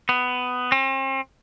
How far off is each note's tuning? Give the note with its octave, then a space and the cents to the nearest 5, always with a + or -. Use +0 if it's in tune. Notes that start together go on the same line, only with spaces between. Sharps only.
B3 +15
C4 +40